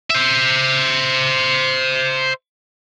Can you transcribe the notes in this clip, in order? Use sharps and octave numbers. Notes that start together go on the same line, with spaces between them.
C5 E5